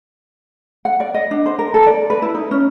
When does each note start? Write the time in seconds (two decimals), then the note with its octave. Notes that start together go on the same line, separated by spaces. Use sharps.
0.85 F#5
1.00 D5
1.14 D#5
1.31 D4
1.46 C5
1.59 A#4
1.74 A4
1.87 D5
2.10 B4
2.22 E4
2.35 D#4
2.51 C#4